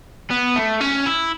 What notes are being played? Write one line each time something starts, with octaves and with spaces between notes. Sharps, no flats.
B3
A3
C#4
E4